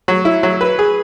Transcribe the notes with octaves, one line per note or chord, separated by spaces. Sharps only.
F#3
E4
F#3
B4
G#4